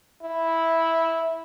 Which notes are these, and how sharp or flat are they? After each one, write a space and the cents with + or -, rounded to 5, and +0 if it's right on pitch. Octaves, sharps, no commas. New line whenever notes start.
E4 -10